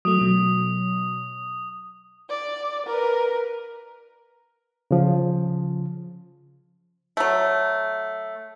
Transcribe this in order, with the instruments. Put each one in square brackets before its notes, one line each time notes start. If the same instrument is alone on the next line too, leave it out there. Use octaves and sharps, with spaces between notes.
[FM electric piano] F#3 A3 [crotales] D#6
[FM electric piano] B2 F#3
[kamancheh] D5
A#4 B4
[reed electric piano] C#3 F3
[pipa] F#3 A3